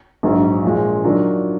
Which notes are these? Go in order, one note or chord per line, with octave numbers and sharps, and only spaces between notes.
A#1 G#2 F#3
A#2 F3 G#3
D#3 F#3 D4 F4 A#4